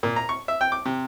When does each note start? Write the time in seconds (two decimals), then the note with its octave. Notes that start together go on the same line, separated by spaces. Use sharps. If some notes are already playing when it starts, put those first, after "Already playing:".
0.03 A#2
0.16 A#5
0.29 C#6
0.48 E5
0.61 G5
0.72 D6
0.85 C3